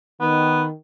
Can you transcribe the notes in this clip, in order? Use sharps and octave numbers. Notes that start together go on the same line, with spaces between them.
D#3 B3